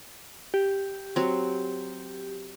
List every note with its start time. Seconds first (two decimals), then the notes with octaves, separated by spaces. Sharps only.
0.54 G4
1.16 F#3 C4